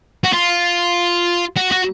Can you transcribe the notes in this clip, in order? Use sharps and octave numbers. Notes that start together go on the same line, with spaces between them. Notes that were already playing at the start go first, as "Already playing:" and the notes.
F#4
F4
F#4
F#4